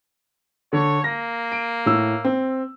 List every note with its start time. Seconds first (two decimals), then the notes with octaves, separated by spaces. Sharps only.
0.73 D3 C#5
1.04 A#3 A#6
1.52 D7
1.86 A2 E6
2.24 C4